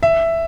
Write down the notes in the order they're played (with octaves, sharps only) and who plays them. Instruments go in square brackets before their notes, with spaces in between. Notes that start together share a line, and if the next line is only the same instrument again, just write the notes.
[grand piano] E5